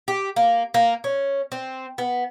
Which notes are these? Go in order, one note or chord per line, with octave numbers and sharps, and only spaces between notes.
G4
A#3
A#3
C#4
C4
B3